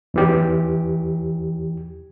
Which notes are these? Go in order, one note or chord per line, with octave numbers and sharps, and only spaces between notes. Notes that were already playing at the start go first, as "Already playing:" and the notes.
E2 E3 G4